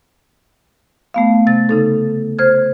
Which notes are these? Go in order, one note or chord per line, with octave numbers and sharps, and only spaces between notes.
A3 B3 F5
C3 A6
C#3 D#4 A4
C5 F6 G#6